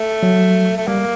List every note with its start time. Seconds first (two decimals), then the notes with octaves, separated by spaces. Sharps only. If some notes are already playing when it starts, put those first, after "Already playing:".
Already playing: A3
0.23 F#3
0.77 A3
0.87 G3 A#3